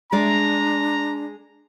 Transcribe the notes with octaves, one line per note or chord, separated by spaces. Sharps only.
G#3 D4 D5 A#5